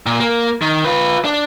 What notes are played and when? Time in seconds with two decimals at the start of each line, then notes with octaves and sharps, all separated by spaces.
0.06 A#2
0.20 A#3
0.62 D#3
0.85 F4 B4
1.25 D4